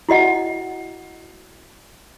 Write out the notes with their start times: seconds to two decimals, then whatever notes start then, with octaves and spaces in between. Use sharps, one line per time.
0.09 E4 F#4 D#5 F#5